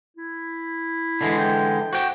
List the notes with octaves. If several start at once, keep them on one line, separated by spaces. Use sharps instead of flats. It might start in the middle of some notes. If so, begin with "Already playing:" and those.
E4
D3 E3 G#3
G5
F#4 C5 G5